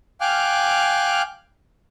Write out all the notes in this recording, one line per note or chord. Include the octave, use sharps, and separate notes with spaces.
F5 G5 G#5 D6 F6 F#6